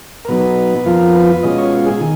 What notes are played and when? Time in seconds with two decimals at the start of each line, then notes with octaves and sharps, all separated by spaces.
0.25 A#4
0.28 B2 F#3 B3 D#4 B4
0.86 F2 F3 B3 F4 A#4
1.15 B4
1.43 B2 G#3 C#4 F4 D#5
1.58 C#5
1.86 G#4
2.00 D#3